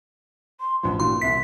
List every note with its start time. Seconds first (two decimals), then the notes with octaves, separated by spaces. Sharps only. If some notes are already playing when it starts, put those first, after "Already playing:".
0.60 C6
0.83 A1 G2 F3 C6
1.00 G2 A#2 E3 F#4 C6
1.21 C2 E5 B6 C7